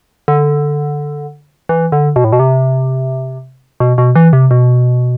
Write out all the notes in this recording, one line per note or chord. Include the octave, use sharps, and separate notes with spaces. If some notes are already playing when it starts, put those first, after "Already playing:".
D3
E3
D3
B2
A2
B2
C3
B2
B2
E3
C3
B2